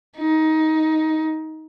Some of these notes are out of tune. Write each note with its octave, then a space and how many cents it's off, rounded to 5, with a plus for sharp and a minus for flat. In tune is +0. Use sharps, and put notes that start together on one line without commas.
D#4 +15